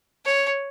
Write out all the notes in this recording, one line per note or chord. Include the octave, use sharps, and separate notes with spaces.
C#5